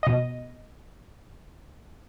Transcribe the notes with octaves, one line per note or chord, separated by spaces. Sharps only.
B2 D#5